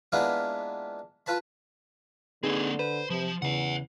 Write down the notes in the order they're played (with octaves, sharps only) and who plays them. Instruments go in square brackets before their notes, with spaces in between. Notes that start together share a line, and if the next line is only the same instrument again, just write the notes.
[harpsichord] G#3 A#3 B3 D4 E4 F4
F4 B4 A5 B5
[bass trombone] D3 [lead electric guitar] A#3 C4 [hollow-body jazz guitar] D#4 G#4 B4
[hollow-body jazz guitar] B4 [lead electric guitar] C5
[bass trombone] C3 [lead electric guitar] F3
[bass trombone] E2 [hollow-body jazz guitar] C#3 [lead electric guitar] E5 F#5